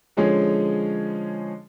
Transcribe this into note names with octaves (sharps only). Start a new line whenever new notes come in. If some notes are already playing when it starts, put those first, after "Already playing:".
D3 F3 G#3 C#4 G#4 C#5